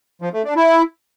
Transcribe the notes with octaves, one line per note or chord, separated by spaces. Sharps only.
F3
A3
D4
E4